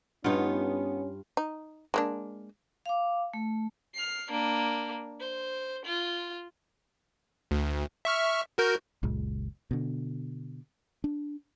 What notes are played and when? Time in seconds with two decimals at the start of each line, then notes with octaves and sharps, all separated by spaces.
0.24 G2 B3 C#4 D#4 F4
1.37 D#4
1.94 G#3 A#3 D4
2.86 F5 D6
3.34 A3
3.94 F6 C7
4.31 A#3 D4
5.20 C5
5.85 F4
7.51 D2
8.05 E5 C#6 F6
8.58 F#4 A#4 G6
9.03 F#1 C#2 A#2 G#3
9.71 B2 D3
11.04 D4